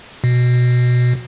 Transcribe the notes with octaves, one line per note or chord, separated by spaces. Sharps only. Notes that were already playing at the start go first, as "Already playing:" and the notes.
B2